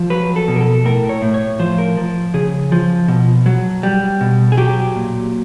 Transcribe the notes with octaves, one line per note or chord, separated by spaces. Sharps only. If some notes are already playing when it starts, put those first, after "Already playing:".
Already playing: F3
F#3 B4
A4
B2
A#4
A4
A2 A#4
C#5
A2
C#5
F3 C5
A#4
F3
C#3 G#4
F3
B2
F#3
G3
B2
G#4
F#3 G4
A#2